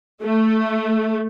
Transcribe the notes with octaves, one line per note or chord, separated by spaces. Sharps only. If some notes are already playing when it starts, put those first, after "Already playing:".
A3